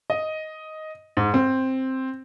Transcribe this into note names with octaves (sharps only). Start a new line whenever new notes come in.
D#5
G#2
C4